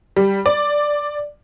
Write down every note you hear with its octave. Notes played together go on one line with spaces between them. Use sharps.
G3
D5